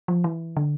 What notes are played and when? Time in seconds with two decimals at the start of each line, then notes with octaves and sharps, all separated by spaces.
0.08 F3
0.24 E3
0.57 D3